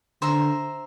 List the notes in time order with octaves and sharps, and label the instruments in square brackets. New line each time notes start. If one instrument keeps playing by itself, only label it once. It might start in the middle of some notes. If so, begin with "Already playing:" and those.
[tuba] D3 [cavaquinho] C5 E5 A#5